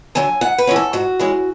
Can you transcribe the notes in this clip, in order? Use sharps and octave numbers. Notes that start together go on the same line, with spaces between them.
D3 F#3 G#5
G#2 F#5
B4
E3 G#3 C#4
A4
G#2 F#4
E3 G#3 C#4